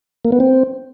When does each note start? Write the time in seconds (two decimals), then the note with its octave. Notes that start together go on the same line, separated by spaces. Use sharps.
0.25 A#3
0.32 B3
0.40 C4